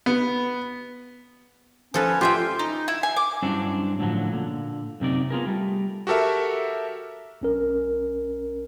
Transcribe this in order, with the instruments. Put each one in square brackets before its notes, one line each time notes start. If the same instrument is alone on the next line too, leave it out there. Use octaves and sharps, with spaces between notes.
[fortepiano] B3
[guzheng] F3 A4 B4 [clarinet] C#4
[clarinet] F4 [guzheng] G4 E5 G5
[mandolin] D#4
E4
G#5
D6
[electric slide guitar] G2 F#3 C#4 D4 E4 C5
A2 D3 F3 F#3
A#2 D3
F#2 C3 D#4 D5
B3 F4 G#4 A#4
G3 A3
[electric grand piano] F#4 G4 A4 A#4 E5
[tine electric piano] B1 C#4 A#4